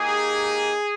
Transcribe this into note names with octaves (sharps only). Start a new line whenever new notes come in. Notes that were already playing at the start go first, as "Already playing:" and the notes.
Already playing: A#3 D#4 G4 G#4